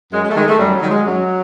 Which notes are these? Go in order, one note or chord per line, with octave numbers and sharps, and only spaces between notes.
F#2 G#3
G#3
A3
D#3 G#3
A3
F#2 G3
F#3
D#3
G#3
F#2 F#3